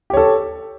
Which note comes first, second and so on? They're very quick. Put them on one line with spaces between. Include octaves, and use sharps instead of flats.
G4 C#5 A4